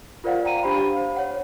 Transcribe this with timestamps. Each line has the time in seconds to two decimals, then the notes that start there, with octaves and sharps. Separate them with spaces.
0.24 F4 A#4 C5 D5 F5 F#5
0.45 G5 A#5 D#7
0.63 D4 G4 C5 F5 B5
0.97 C5
1.16 C#5 F#5